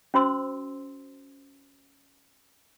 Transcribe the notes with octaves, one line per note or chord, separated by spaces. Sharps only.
C#4 F#4 C5 C6 E6